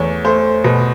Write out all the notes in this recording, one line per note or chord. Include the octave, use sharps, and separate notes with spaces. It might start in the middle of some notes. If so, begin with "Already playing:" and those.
Already playing: E2 A3 C#5
A3 C5
B2